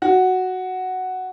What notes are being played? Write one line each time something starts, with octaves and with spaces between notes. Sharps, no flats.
F#4